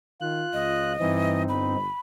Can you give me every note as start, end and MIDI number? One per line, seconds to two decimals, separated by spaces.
0.21 0.45 51
0.21 0.92 65
0.21 0.92 90
0.53 0.96 37
0.53 1.43 75
1.00 1.76 43
1.00 1.47 52
1.00 1.76 60
1.00 1.76 63
1.49 1.88 31
1.49 2.00 83